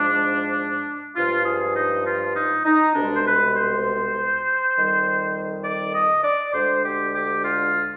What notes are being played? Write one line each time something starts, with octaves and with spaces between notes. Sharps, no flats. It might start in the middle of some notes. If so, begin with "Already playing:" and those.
Already playing: G#2 F3 G#3 D4
G2 F3 G#3 F4
G#4
D#4
F4
D#4
D#4
C2 B2 G#3 D4
C5
B4
C5
F2 D#3 G3
D5
D#5
D5
D2 D3 G#3 C5
G4
G4
F4